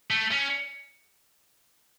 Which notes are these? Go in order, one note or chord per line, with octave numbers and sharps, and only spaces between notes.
A3
C#4